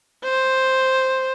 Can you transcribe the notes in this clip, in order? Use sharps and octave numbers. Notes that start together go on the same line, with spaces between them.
C5